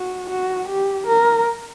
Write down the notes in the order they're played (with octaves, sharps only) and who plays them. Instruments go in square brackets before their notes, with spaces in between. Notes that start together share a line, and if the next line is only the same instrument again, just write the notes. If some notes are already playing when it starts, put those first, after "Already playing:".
Already playing: [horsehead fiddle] F#4
F#4
G4
A#4